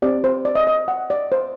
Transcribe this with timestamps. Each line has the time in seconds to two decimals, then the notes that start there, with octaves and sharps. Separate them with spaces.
0.02 C4 G4 D5
0.24 C5
0.45 D5
0.55 D#5
0.67 D#5
0.88 F#5
1.10 D5
1.32 C5